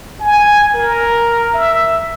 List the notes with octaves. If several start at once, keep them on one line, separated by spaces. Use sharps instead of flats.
G#5
A#4
E5